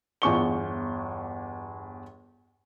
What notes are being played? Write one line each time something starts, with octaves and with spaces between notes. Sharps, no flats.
G1 E2 C#6 G7